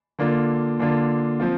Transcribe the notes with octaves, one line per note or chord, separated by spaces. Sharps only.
D3 A#3 D4 F4
D3 A#3 D4 F4
F3 C4 F4